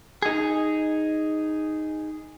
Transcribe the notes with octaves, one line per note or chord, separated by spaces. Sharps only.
D#4 G#4